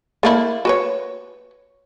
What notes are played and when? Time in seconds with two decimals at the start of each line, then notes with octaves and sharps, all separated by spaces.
0.23 A3 A#3 E4
0.65 F#4 B4 C#5